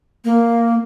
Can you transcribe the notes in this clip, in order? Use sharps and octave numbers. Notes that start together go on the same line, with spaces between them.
A#3